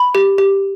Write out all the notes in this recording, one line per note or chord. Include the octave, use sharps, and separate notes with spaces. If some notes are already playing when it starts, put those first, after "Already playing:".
Already playing: B5
G4
G4